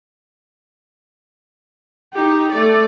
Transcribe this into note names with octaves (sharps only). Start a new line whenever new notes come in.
D#4 G4
A3 D5